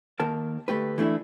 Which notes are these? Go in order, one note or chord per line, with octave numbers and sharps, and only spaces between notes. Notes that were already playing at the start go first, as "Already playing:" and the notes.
D#2 A#4 A5
D2 G2 A3 G4 B4
E3 A3 D4 E4 E5